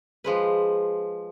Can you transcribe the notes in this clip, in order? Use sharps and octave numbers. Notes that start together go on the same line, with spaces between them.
F3 G#3 B4